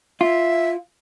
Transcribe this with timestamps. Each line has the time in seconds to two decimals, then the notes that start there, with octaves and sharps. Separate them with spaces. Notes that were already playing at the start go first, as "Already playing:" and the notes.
0.21 F4 E5